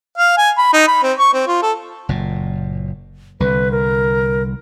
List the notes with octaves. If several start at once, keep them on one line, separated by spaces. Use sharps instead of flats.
F5
G#5
B5
D#4
B5
C4
C#6
C4
F4
A4
F#1 A#2
C2 D3 B4
A#4